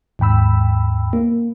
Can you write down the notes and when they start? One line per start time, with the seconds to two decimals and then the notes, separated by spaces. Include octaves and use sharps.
0.19 D#2 G#2 G5 B5 E6
1.13 A#3